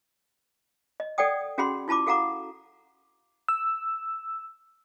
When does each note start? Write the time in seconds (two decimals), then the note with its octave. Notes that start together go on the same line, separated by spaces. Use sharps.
1.00 D#5
1.18 A4 D5 F#5 G5 D#6
1.58 C#4 F#4 G#4 F#5 B5 C6
1.88 E4 F4 A5 B5 D6
2.06 F#4 A4 F5 F#5 A#5 D6
3.48 E6